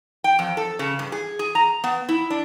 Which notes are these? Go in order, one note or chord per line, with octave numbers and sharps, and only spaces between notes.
G5
F2
A4
C#3
G2
G#4
G#4
A#5
B3
E4
D4